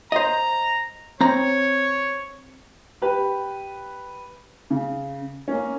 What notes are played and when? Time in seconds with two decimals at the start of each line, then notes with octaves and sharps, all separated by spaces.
0.12 C5 D#5 A#5
1.21 C4 C#5 A#5
3.02 G4 B4
4.70 C#3
5.48 A#3 C#4